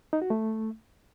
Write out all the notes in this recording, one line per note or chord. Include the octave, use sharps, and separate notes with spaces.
D#4
F#4
A3